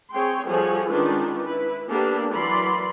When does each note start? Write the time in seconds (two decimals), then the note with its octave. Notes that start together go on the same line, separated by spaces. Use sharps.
0.11 C4 G#4 C#5 G5 C6
0.47 F3 G3 F#4 G#4 A4 C#5
0.89 D#3 G#3 C#4 D4 F4 B4
1.44 E4 B4
1.89 A#3 B3 D4 G4 A4
2.32 E3 F#3 A#4 D5 B5 C6